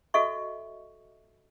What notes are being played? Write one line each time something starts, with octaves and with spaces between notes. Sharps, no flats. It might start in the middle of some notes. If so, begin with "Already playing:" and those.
F#4 A4 D#5 E5 C#6